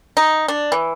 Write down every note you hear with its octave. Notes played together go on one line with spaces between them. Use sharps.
D#4
D4
E3